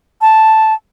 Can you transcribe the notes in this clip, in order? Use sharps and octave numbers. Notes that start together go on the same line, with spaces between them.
A5